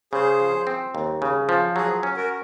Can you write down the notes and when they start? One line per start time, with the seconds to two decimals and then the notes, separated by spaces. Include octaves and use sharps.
0.13 C#3 G#4 C5
0.40 F3
0.67 C4
0.95 D#2
1.22 C#3
1.49 F3
1.76 F#3 G#4
2.03 C#4
2.17 F#4 A#4